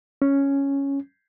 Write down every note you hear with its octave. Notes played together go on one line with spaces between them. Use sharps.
C#4